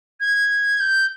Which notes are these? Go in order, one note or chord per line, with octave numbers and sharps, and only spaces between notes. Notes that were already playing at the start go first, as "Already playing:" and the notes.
G#6
G6